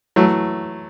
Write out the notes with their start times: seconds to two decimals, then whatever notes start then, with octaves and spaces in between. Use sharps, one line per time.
0.16 E3 F#3 A3